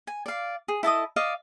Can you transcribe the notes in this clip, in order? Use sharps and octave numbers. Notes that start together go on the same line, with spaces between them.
G#5
D5 F5
G#4
E4 A4 D#5 D#6
D5 D#5 F5